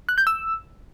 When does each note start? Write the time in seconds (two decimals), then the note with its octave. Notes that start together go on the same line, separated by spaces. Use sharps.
0.09 F#6
0.18 G6
0.27 E6